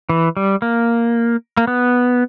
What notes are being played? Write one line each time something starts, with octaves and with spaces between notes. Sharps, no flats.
E3
G3
A#3
A#3
B3